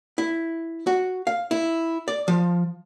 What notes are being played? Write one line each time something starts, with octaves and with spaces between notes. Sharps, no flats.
E4
F#4
F5
E4
D5
F3